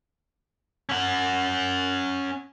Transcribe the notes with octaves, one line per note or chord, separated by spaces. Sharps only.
C#4 F#5